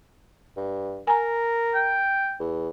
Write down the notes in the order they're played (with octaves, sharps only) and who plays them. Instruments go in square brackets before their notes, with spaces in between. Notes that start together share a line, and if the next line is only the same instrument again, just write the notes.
[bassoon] G2
[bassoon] A#4 [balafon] G#5 A#5
[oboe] G5
[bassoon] E2